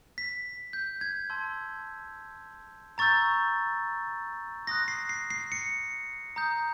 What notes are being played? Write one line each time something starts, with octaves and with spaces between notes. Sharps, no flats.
B6
G6
G#6
A5 C6 E6 G6
A#5 C#6 E6 G6 A6
C6 D#6 F#6 A#6
C7
C7
C7
C#7
A#5 D#6 G6